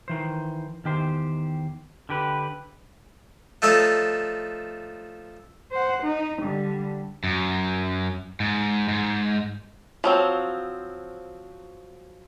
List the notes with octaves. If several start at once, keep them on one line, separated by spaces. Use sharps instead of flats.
D#3 E3 C5
E2 D#3 G4 C5
D3 G4 B4
F3 A3 D#4 A4 C#5
C5 F#5
D#4
D3 G3
F#2
G#2
G#2
F3 F#3 C4